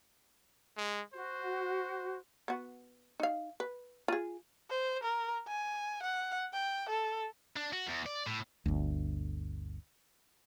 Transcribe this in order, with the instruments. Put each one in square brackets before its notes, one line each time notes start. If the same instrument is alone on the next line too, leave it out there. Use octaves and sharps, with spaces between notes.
[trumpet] G#3
[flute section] F#4 [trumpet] C5
[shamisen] B3 F#4
D#4 F5
B4
F4 G#4
[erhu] C5
A#4
G#5
F#5
G5
A4
[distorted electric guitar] D4
F#4
E2
D5
A2
[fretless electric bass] G1 D2